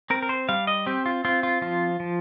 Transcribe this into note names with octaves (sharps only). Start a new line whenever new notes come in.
C4 A#4
A#4
C5
G3 F5
D#5
C4 G4
F4
C4 F4
F4
F3 F4
F3